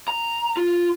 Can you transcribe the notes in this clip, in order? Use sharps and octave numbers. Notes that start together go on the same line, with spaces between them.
A#5
F4